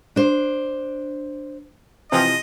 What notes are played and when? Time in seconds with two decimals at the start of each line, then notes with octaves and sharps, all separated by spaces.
0.16 D4 C5
2.12 C3 E3 F3 D#5